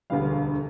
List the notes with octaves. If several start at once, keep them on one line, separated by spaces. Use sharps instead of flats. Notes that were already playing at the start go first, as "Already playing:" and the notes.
E1 D2 D3 G3 B3 F5